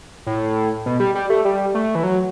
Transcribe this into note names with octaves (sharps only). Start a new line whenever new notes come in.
A2
B2
G3
G3
A3
G3
A3
E3
F#3